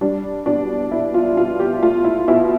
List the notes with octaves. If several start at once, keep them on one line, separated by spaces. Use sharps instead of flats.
G3 D4
B2 D4
B2 E4
F4
B2 F4
G4
A3 F4
E4
B2 E4